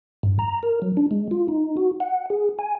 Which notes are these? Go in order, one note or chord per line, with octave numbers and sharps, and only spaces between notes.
G2
A#5
A#4
F#3
D4
G#3
F4
D#4
F#4
F#5
G#4
G#5